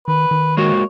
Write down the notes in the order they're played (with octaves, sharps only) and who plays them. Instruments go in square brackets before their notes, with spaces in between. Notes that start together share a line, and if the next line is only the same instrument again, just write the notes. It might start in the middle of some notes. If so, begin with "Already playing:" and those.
[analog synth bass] D#3 [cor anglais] B4
[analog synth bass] D#3
[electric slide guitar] G#3 A#3 F#4 [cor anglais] C#5